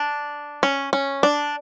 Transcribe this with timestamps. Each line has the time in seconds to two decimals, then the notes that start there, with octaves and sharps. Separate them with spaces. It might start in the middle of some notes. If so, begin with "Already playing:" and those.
Already playing: D4
0.63 C#4
0.93 C#4
1.23 D4